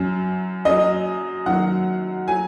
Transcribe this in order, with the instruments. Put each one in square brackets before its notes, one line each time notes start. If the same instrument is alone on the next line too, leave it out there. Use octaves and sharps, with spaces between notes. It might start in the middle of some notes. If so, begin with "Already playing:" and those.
Already playing: [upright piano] F#2 F#3
F#2 F#3 D#5
F#2 D#3 F#3 F#5
F#3 G#5